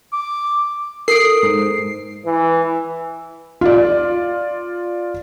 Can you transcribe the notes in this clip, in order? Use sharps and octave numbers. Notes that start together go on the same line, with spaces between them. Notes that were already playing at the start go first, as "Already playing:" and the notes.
D6
A4 A#4 D#6 C7 D7
G#2
E3
F4 D5